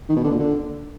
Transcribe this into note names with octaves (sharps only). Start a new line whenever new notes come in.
D#3
B2
D3
A#2
D3